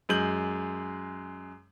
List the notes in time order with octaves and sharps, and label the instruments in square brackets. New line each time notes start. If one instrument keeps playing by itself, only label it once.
[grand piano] F#2 G#3 G6 F#7